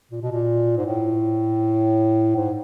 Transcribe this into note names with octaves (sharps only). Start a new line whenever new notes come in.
A#2
B2
A#2
G#2
A2
G#2